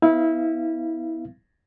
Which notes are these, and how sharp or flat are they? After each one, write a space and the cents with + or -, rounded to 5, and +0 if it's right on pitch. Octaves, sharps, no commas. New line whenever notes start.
B3 +10 E4 -25 F5 -35